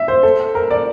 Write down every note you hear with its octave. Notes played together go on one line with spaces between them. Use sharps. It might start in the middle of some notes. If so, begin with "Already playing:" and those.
Already playing: E5
C5
A4
A#4
D5